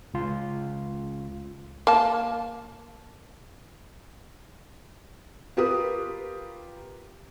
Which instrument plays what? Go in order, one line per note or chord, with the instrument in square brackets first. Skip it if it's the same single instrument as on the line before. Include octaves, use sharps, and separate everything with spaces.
[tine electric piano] C#2 F4
[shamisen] A#3 A5
[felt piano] F4 G4 A#4 B4 D#6